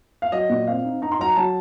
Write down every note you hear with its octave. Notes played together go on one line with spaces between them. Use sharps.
F5
F#3 D#5
A#2
C4 F5
D#4
D#4 A#5
C6
F#3 A#5
F#3 A5